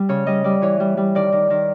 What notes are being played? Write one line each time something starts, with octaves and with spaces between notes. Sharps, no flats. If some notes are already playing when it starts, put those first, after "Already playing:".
Already playing: G3
C#3 C#5
G3 D#5
G3 D5
E3 C#5
G3
G3
D#3 D5
D#3
D#3